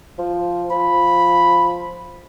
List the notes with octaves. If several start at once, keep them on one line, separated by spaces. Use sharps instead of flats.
F3
F3 B5